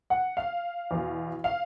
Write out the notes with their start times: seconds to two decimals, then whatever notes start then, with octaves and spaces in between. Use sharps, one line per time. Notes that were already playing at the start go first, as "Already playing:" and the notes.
0.10 F#5
0.37 F5
0.91 E2 B2
1.44 F5